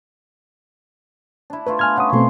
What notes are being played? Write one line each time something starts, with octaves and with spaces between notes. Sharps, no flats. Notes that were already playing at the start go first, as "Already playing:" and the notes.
D4 E4
A3 E4 F4 B4
B3 G#5 F6 G#6
C#4 F#5 D#6
B2 A3 C4 C#5 C6 C#6